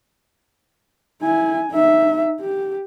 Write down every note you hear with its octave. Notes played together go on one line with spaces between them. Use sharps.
E4 G#5
D#4 E5
G4